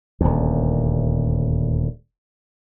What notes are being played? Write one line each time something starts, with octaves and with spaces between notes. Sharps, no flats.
D#1 D2